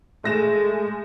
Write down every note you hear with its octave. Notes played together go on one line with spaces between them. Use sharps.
G#3 A3 A#6 E7